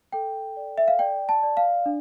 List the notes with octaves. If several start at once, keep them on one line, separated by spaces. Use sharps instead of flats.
A4 G5
D5
E5
F5
D5 G5
A5
D5
F5
D4